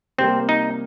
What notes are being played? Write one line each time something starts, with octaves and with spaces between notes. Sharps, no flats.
C3 G3 A#3 C4
D#4